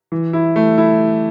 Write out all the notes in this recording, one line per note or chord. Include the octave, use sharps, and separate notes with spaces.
E3
E4
A3
E4